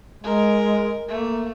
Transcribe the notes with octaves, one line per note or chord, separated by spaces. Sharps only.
G#3 A#4
A3 A#3